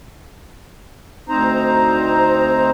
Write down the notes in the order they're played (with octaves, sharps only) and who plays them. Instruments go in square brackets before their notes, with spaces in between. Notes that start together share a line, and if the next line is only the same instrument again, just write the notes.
[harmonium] D2 C4 D#4 C5 A#5